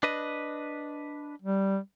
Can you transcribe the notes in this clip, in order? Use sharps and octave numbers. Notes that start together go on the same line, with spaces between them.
D4 B4 D#5
G3